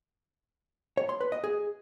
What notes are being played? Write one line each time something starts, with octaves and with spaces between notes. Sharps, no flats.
C#5
C6
B4
D#5
G#4